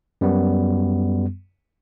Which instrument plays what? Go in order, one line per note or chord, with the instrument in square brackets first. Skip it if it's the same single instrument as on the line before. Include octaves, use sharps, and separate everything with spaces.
[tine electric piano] F#2 G3 B3